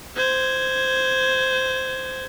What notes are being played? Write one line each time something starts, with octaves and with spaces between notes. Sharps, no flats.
C5 G#6